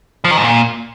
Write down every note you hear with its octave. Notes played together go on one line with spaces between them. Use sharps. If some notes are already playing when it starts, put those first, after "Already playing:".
F3
D#3
G#2
A#2